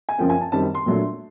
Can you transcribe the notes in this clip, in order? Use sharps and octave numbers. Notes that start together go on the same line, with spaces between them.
G#5
F#2 C#3 F3 A#3 G5
G#5
A5
F#2 D#3 G3 C4 A5
C6
A#2 F#3 A3 D4